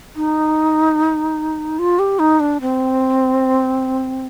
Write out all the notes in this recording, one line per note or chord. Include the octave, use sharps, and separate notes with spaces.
D#4
F4
G4
D#4
D4
C4